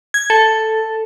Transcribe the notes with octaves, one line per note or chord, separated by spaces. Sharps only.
G#6
A4